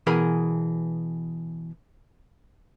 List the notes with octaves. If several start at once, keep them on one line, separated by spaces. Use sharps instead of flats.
B2 E3 G#4 A#4 B5